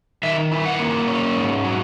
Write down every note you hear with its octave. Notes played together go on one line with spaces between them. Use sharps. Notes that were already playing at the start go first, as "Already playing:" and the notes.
D#3 E5
E4
F#5
A#3
C#4
G#2
F#3